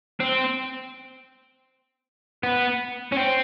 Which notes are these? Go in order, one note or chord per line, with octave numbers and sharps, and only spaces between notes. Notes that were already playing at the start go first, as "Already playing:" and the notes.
C4
B3
C#4
C4